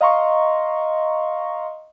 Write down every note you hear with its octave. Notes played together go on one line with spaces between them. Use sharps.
D#5 F5 A#5 C6 C#6